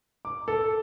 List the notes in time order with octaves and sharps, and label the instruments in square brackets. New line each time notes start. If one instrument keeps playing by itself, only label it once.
[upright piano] D6
A4